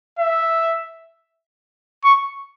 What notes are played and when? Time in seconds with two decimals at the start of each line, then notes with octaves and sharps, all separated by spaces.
0.19 E5
2.04 C#6